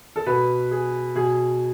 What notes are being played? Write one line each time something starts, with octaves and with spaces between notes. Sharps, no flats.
A4
B2 B4
G#4
B2 G#4